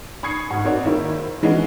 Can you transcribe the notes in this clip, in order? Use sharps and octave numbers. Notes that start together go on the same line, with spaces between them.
B5 C#6 D#6 G#6 C7 C#7
G#2
C4 D#4 F#4 A#4 C#5 D5
D#3 A#3 E4 A#4
C5
E3 G#3 B3 C#4 D4 F#4